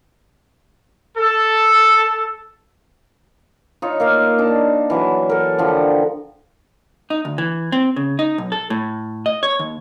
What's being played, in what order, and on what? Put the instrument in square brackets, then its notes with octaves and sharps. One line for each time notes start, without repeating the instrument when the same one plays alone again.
[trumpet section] A4
[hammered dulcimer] D#4 F4 C#5
A#3 A#4 F5
D4 D#4 A5
E3 F#3 B4
A4 A#4
D3 F3 G4
[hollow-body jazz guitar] D#4
D2
E3
C4
C#3
D#4
B1
A4
A2
D#5
C#5
D#2